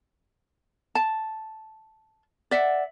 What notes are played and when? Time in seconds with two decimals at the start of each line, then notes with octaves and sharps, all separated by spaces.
0.95 A5
2.51 D5 E5 F#5